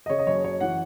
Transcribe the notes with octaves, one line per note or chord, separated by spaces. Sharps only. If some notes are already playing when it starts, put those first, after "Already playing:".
D#5
C#3 C#5
D#5
F#1 C#5
F#2 C#5
E3 F#5